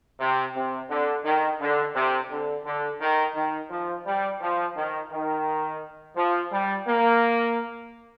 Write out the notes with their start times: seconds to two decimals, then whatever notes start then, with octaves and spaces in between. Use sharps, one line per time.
0.20 C3
0.55 C3
0.89 D3
1.24 D#3
1.60 D3
1.94 C3
2.30 D3
2.65 D3
3.00 D#3
3.35 D#3
3.70 F3
4.06 G3
4.41 F3
4.76 D#3
5.11 D#3
6.16 F3
6.52 G3
6.87 A#3